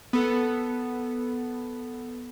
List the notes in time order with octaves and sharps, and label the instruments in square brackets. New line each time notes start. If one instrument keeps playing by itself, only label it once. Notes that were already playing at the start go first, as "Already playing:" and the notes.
[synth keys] B3 A4